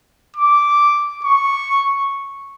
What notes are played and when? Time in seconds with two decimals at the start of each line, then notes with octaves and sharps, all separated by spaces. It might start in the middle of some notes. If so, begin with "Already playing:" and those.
0.36 D6
1.25 C#6